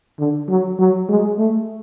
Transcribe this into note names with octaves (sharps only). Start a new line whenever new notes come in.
D3
F#3
F#3
G#3
A3